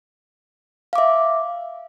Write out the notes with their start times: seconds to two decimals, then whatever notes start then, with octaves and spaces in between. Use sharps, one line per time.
0.93 F5
0.96 D6
0.98 E5